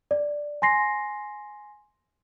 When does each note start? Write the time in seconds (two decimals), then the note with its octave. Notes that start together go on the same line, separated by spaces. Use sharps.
0.11 D5
0.62 G#5 C6 A#6 C7